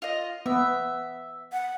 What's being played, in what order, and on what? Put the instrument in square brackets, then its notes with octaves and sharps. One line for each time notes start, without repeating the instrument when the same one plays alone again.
[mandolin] F4 D#5
[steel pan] B3 [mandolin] E5
[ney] F#5